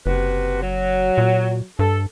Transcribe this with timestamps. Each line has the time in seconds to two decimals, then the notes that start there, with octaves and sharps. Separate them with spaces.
0.06 F#1 C3 F#4 B4
0.62 F#3
1.18 A#2
1.79 G2 A4